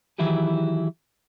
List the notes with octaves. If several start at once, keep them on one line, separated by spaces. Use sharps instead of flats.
D#3 E3 F#3 E4 G4 G#4